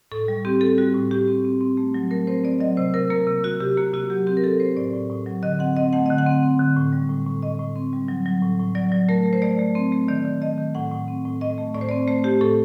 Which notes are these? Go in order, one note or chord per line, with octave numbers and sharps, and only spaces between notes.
A2 A4
G3
C4 G4
C4 A4
G3 F#4
A2
A2 G4
C4
C4
C4
A3
F#3
A3 A#4
C4 C5
C4 D5
F#3 D#5
C3 C5
C3 A#4
A#3 A#4
C3
C3 F#4
C3 G4
A#3 F#4
C3 F#4
F#3 G4
C4 G4
A#4
C4 A4
C4 C5
A2 D5
A2
A2
F#3
D3 D#5
C4 F#5
C4 D#5
A3 F#5
D3 D#5
F#5
C4
C4
D3
A2
G3
A2
A2
A2 D#5
A2
C4
G3
F#3
F#3
A2
A2
F#3 D5
F#3
A3 A#4
A3
C5
A3 D5
A3
C4
A3
D#3 D5
D#3
A3 D#5
D#3
A2 F#5
A2
C4
A2
A2 D#5
A3
A2 D5
C5
C4 D5
A3 C5
A3 G4
A2 A4